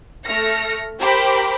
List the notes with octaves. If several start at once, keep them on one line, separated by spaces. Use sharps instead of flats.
A3 F6 A#6 C#7
G4 A#4 C5 G5 B5 D6